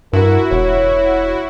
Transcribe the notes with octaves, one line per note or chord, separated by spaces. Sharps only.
G2 E4 F#4 A#4
E1 C#5